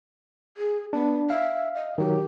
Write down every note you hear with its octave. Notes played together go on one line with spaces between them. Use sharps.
G#4
B3 D4
E5 F5
D#5
D#3 F#3 G4